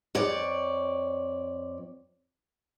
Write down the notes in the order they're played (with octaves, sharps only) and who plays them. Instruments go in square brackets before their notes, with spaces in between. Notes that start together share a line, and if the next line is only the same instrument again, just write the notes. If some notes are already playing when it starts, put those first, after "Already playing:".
[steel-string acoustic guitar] F2 C#5 D5